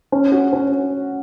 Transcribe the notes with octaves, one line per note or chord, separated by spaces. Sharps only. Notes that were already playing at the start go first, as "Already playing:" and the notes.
C#4
F#4
C#4